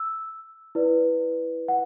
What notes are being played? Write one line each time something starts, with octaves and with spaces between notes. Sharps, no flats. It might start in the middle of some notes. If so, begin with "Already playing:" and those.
Already playing: E6
E4 B4 D5
F#5